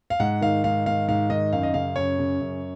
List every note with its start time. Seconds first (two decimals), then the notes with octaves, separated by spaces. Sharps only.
0.10 F5
0.20 G#2 F#5
0.41 D#3 F5
0.64 G#2 F5
0.86 D#3 F5
1.08 G#2 F5
1.30 D#3 D#5
1.53 F#2 F5
1.63 D#5
1.74 C#3 F5
1.96 F#2 C#5
2.19 C#3
2.41 F#2